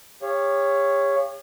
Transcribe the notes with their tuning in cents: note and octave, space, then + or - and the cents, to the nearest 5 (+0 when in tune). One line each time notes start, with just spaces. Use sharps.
G4 +40 C#5 +0 F5 -25